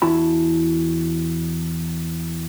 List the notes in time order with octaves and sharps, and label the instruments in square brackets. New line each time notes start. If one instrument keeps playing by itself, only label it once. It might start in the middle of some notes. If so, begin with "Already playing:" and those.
[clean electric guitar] E2 E4 F#4 A5 B5